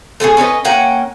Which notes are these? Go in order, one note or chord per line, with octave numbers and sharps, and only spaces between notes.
A3 C#4 G4 G#4
C#4 B4 C#5 D#5
A#3 C#4 F#5 G5